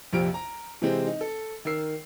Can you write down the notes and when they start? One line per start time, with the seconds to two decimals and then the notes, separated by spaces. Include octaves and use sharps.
0.13 A#1 F2 C3 F6 D7
0.34 A#5
0.82 C3 E3 G#3 C4
1.06 D#4
1.21 A4
1.65 D#3 A#4 E6 C7